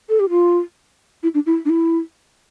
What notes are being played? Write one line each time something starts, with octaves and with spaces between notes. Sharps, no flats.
A4
G4
F4
E4
D4
E4
D4
E4